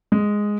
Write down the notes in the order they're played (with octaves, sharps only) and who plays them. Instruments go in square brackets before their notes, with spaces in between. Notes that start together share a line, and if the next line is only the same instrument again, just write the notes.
[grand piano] G#3